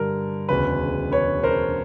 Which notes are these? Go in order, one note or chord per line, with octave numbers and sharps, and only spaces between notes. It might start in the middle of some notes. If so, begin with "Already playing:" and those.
Already playing: G2 D3 G3 A#4
E1 D2 C#3 B4
B4 C#5
A#4 C5